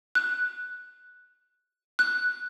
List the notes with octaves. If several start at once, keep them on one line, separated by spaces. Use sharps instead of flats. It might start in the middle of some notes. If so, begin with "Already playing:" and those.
F#6
F#6